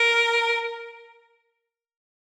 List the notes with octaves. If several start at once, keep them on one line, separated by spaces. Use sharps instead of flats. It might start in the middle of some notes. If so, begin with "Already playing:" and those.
Already playing: A#4